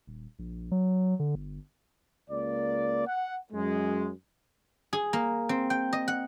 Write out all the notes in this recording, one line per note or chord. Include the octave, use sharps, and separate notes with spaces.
D#1
A#1
F#3
D3
G1
C#2 A#3 D5
F#5
F#2 G#3
G#4
A#3
C4
G5
D#5
F#5